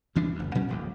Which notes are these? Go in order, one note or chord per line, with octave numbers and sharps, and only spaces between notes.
D2 E3 G3 D4
F#1 D2
A#2 F#3 G3 C#4
D1 A#1 D#2